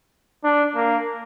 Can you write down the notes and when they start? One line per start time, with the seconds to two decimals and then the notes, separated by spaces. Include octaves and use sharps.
0.44 D4
0.75 A#3